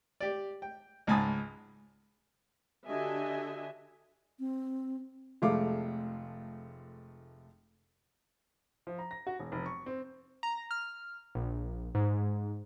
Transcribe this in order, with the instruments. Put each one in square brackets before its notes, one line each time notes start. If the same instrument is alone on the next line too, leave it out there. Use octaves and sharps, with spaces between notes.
[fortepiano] G4 D5
G5
C#2 G#2 G#5 A5 B5 D#6
[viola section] D3 F#4 G4 D#5 E5 G#5
[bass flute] C4
[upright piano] F1 F3 G#3 A3 F5 D6
F3
A#5
A#6
F#4
E1
F1
C#6
C4
[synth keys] A#5
F6
A#1
G#2